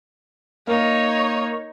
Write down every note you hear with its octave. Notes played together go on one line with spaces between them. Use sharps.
A#3 D#4 C#5